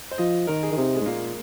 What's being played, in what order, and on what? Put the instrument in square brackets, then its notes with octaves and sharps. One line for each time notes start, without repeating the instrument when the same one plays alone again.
[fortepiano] C5
[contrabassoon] F3 [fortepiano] D#5
[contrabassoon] D#3 [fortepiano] A#4
[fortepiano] G#4
[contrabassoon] D#3
[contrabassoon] C3 [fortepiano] D#4
[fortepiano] G#3
[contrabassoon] G#2
[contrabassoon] A#2 [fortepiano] A#3